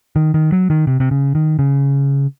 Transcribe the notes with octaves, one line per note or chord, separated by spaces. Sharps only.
D#3
D#3
F#3
D#3
C3
C3
C#3
D#3
C#3